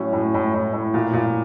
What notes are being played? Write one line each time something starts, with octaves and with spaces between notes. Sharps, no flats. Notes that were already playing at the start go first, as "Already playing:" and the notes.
Already playing: A2 F#3 C#4
A2
A2
A2
A2
A#2
A#2